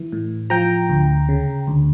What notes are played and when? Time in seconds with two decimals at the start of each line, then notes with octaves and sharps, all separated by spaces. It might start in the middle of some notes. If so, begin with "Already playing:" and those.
Already playing: E3
0.12 A2
0.50 F3 G5 A#5
0.90 D2
1.29 C#3
1.67 D2